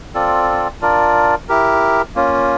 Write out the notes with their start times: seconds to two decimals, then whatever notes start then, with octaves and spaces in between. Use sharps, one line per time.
0.14 C4 F4 A4 D5
0.81 D4 F4 A#4 D5
1.49 E4 G4 A#4
2.16 A#3 C#4 F4